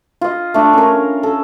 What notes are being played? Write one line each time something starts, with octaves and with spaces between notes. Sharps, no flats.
F4 D#5
A3 D4
C#4 A#4
A4